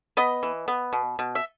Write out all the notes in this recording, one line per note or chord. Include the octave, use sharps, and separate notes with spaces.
B3 B4 D#5
E3
B3
B2
B2
E5